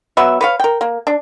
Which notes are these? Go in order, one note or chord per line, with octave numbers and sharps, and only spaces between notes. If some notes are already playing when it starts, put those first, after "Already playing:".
F#3 B3 B4 E5
B4 C#5 F5
A#4 G5
A#3
D4